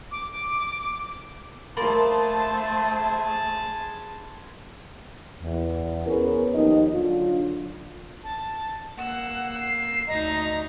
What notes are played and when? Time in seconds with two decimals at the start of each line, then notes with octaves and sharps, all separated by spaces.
0.12 D6
1.77 A3 A#3 G#4 C5 A5 B5 C6 A6
5.41 E2
6.06 B3 C#4 G#4 A#4 B4
6.54 D#2 D#3 F3 D#4 D#5
6.94 D3 F#3 D4 F4
8.24 A5
8.98 A#3 F#5 E6
9.60 C7
10.08 D2 D#4 D#5 A#5